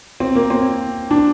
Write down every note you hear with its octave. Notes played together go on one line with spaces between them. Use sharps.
C4
A#3
C4
D4